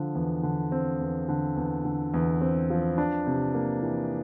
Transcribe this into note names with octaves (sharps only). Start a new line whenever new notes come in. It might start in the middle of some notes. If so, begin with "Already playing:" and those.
Already playing: D3 F3
E2
D3
C4
E2
D3
E2
D3
E2
C4
F3
D4
C3
A#3
E3